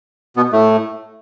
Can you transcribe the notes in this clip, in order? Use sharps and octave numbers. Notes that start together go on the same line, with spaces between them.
B2 B3
A2 A3